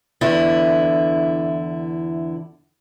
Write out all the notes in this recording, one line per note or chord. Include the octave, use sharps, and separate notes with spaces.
E2 D3 E4